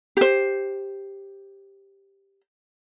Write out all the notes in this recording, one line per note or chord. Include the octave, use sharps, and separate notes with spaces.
G4 C5